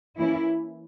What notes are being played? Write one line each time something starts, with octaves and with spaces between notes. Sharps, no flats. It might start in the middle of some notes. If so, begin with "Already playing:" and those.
E3 A#3 C#4 E4